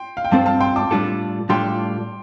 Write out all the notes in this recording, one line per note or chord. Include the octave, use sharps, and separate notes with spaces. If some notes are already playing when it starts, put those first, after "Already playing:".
Already playing: G5 C6
F5
G5
G2 G3 C4 A4 C5 F5 A5
F5 A5
G5 C6
A5 D6
A2 G3 D4 F4 A4
A2 G3 D4 F4 A4 G5 C6